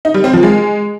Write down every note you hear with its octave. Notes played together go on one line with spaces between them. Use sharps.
D#4
G3
C4
F3
G#3